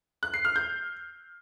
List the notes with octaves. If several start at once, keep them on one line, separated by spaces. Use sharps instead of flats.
F#6
C7
F6
G6